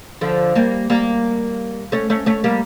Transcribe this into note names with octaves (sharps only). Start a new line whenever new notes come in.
D3 F3
G3 A#3
G3 A#3
A3 C#4
A3 C#4
A3 C#4
G3 A#3